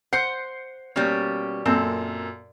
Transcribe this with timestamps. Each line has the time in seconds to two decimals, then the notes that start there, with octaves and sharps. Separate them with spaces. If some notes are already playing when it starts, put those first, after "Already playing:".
0.13 C5 F#5 G6 C7 C#7
0.96 B2 G3 A#3 C#4
1.66 F#2 A#2 C4 A4